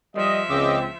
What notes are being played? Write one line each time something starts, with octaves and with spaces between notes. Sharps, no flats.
F3 G3 D#5 E5
C#2 C#3 C4 D#5 D6 E6